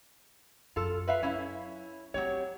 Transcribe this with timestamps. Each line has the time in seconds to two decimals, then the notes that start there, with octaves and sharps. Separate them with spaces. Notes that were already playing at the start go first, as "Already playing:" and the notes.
0.76 F#2 F4 A4
1.08 B4 E5 F5
1.23 F#3 C#4 E4
2.14 F#3 C4 E4 G4 C#5